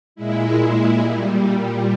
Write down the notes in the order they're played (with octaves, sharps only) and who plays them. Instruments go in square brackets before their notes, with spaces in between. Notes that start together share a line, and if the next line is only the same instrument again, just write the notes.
[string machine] A#2 G#3 E4
A#2 G3